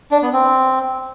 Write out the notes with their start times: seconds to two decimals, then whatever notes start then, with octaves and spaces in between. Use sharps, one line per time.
0.11 D4
0.22 B3
0.33 C4